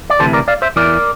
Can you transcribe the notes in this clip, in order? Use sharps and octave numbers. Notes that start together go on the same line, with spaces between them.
D5
D2 C3 E3 A4 C5
A#4 D5
D5 F5
C5 E5
E2 E3 A#4 D5